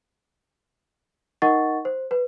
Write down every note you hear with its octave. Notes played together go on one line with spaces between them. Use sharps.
D#4 A#4 D#5 F#5 C#6 A6
C5
B4